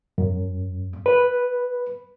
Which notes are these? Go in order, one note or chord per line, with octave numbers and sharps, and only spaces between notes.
F#2
B4